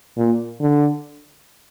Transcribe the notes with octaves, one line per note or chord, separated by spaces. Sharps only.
A#2
D3